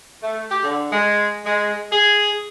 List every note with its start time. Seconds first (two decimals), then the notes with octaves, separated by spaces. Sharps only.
0.22 A3
0.51 G4
0.64 D3
0.92 G#3
1.45 G#3
1.92 G#4